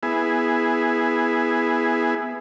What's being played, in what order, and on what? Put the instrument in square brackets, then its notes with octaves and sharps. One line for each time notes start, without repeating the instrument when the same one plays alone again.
[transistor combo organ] B3 E4 G#4